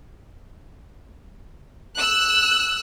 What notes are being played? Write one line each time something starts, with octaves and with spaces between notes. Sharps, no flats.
E6 F#6